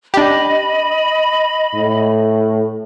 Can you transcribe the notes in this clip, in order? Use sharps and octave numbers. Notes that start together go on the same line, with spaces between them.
D4 G4 D#5 B5
A2